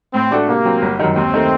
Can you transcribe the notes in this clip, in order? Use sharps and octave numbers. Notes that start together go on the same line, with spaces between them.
A2 C4
A3 D4 F#4 A4
C3 A#3
F#3 C4
G1
F#2 D#3
D#2 C4
D#3 A3